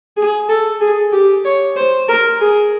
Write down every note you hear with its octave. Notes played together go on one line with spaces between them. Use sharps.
G#4
A4
G#4
G4
C#5
C5
A#4
G#4